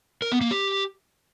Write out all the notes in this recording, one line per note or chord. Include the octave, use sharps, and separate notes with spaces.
A#4
B3
A#3
G4